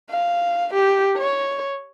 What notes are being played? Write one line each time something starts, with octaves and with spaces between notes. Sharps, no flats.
F5
G4
C#5